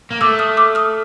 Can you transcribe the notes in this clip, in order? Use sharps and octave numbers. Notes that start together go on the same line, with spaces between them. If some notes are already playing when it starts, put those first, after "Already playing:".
A#3
A3 D6 E6
D#6 F6
D6 E6
D#6 F6